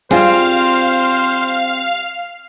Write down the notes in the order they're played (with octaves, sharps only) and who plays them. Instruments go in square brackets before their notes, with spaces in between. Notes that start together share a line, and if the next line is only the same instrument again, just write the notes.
[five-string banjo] G3 F4 G#4 [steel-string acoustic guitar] C4 [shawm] C5 [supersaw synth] F5